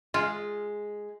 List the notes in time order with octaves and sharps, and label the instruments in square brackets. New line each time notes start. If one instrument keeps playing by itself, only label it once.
[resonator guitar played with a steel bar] G#3 [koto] F4